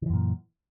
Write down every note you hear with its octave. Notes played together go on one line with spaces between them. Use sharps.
F#2 A#2 D#3 E3